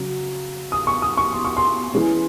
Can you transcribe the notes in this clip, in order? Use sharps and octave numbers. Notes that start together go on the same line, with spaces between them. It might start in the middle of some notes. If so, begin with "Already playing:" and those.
Already playing: C#3 F#3
D#6
C#6
D#6
C#6
C6
C#6
C6
E3 G#3 C#4